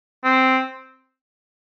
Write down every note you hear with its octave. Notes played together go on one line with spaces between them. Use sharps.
C4